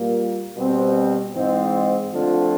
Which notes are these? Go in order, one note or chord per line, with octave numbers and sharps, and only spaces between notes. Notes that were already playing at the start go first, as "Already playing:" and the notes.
Already playing: A#2 G3 A#3
B2 G3 C4
G#2 E3 G#3 C4
D3 F3 A3 C4 F4